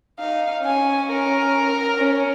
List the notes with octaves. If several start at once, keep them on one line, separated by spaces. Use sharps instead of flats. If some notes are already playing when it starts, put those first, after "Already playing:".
D#4 F5
C#4 G#5
A#4
C#4